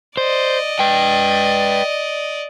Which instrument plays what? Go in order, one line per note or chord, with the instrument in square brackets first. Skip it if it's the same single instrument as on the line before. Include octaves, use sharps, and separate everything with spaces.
[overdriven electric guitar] C5 [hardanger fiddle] D5 D#5
[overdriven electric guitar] B4 G5